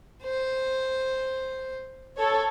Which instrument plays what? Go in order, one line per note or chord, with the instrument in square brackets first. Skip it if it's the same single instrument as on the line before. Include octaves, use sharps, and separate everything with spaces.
[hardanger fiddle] C5
[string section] A4 C#5